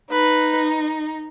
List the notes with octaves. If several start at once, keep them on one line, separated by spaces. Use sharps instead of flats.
D#4 B4